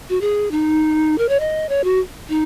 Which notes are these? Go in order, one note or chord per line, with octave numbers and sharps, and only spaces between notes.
F#4
G#4
D#4
A#4
C#5
D#5
C#5
F#4
D#4